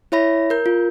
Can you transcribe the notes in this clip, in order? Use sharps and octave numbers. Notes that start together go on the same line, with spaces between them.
E4 C#5 E5 B5 A#6
A#4 G6
F4